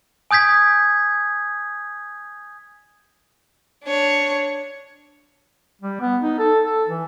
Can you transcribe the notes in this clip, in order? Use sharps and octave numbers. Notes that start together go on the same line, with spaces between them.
G#5 D#6 G6 G#6 B6
D4 C#5
G3
B3
D#4
A4
A4
E3